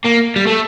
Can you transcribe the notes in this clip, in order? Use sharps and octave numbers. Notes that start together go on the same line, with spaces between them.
A#3
G3
A3